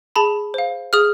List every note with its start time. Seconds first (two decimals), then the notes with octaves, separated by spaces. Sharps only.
0.16 G#4 A5 B5
0.54 C5 F5
0.93 G#4 D#6 F6